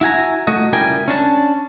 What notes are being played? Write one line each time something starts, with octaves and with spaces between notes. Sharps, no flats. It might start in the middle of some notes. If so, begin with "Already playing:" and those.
E4 F#4 G#5 A#5
A3 F#4 D#5
C#2 G3 E4 A#4 G5 G#5
C#4 D4 A5